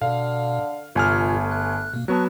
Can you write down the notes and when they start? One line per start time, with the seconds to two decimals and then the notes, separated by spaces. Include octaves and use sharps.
0.02 B2 D3 F5
0.95 G1 C3 A3 F4 G#5 F6
1.51 F#6
1.94 B2 A#3
2.08 F#3 B3 A5 C#6 F#6